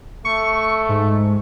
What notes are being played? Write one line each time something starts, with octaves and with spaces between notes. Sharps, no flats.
A3 C#6
G#2